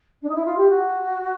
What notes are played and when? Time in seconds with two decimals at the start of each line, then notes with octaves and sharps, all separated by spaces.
0.22 D4
0.29 D#4
0.34 E4
0.45 F4
0.57 G4
0.69 F#4